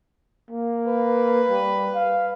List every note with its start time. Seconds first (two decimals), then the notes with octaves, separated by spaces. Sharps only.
0.51 A#3
0.88 B4
1.49 G3
1.95 F5